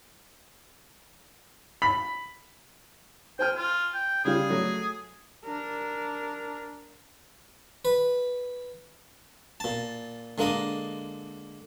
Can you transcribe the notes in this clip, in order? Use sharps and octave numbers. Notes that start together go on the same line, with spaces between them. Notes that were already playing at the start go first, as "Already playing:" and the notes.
B5
C5 G5 G#5 F6
F4
G5
C#3 G3 F4 G#4
F#3 A3
D4 A#4
B4
A#2 A5
D3 G#3 A#3 D4 D#5